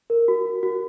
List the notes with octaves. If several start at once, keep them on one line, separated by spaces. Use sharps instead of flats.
A#4
F#4
F#4
F#4